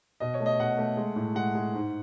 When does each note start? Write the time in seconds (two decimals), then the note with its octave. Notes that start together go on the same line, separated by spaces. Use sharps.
0.20 B2 D#5
0.34 C#5
0.40 A3
0.46 D#5
0.60 B2 F#5
0.78 A3
0.97 G#3
1.16 A2
1.35 G#3 F#5
1.55 G#3
1.74 G#2